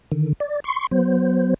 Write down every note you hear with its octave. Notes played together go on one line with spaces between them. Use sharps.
D3 D#3
D5
C6 C#6
F#3 B3 C5